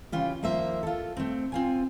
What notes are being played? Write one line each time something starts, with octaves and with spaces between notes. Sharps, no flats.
C#3 E3 F4 G4
D#2 F3 A#3 C5 E5
F4 A4
A3 C4
C4 F4 G#5